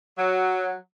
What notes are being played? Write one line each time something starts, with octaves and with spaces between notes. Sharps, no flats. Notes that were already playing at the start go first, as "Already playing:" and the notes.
F#3